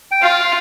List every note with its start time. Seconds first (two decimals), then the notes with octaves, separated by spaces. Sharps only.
0.11 G5
0.22 F4 F5